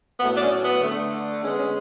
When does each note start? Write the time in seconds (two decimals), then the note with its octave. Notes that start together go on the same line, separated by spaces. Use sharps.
0.19 A2 F#3 A3 B3
0.35 D4
0.41 C#4
0.61 B3
0.81 D3 A3
1.43 D3 G#3 B3 C#4
1.59 C#4